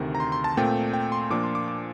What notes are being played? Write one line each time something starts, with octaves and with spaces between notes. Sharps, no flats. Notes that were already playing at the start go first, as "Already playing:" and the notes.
Already playing: D2 C3 D#3
A#5
C6
C6
A5
A#2 A3 C4 G5
G5
C6
A#2 F3 A#3 D4 D6
C6
D6
D6